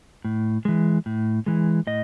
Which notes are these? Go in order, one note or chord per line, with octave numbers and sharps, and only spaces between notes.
A2
E3 G#3
A2
E3 G#3
A2 D#5